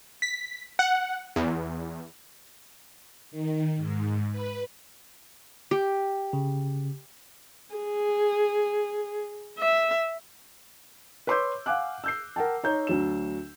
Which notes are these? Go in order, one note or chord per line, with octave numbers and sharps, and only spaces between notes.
B6
F#5
E2
D#3
G#2
B4
G4
C#3
G#4
E5
B4 C#5 C6 D6 E6 G6
F5 F#5 G#5 D6 F#6
E6 G6 C7
A#4 F#5 G5 A5
D#4 C#5 G6
D2 F#3 E7